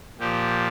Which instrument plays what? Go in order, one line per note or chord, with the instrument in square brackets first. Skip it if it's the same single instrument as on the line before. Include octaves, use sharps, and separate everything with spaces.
[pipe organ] A#2 F3 G4